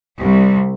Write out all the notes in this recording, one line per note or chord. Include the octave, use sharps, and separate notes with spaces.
C2